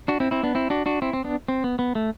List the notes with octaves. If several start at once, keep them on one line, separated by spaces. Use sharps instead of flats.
D4 F#4
C4 E4
C4 E4
B3 D4
C4 E4
D4 F#4
D4 F#4
C4 E4
C4
B3 D4
C4
B3
B3
A3